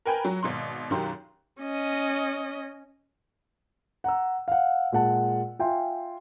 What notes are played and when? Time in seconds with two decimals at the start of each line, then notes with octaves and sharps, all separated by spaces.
0.06 A#4 B4 G5 G#5 B5
0.25 F#3
0.43 G#1 B2 C6
0.90 B1 F#2 D#3 F#3 G4 C6
1.61 C#4 D#5
4.04 F#5 A#5 E6
4.48 F5 F#5
4.92 A#2 G#3 F#5 A5
5.59 F4 E5 G5 G#5 C6